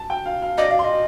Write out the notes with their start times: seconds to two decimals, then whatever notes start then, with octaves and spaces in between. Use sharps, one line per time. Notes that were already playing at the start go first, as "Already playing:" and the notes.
Already playing: A5
0.10 G5
0.26 F5
0.42 F5
0.58 D5 D#5
0.71 F5
0.79 C6
0.84 D#5